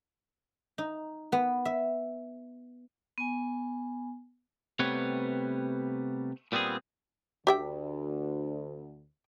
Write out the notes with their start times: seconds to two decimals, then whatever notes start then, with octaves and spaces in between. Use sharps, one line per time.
0.78 D#4
1.32 B3
1.65 E5
3.18 B3 G#5
4.79 C3 G3 A3 B3 B4 C#5
6.52 A#2 G3 B3 C4 G#4
7.47 D2 G4 E5 G5